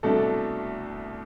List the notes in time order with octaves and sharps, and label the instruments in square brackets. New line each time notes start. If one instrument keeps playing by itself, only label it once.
[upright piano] C2 B2 A3 D4 A4